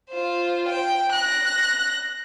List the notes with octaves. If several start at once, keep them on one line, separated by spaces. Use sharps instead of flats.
F4 C5
G5
F#6 A#6